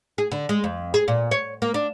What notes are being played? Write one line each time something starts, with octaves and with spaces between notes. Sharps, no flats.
G#4
D3
G#3
F2
G#4
A#2
C#5
A#3
D4